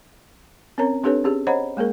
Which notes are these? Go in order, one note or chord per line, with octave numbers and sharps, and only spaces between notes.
C4 C#4 A#4 C#5 A#5
C4 D4 G4 A4 B4 C#5
C#4 G4 G#4
C5 C#5 D#5 F#5 A#5 B5
G#3 A#3 G#4 A#4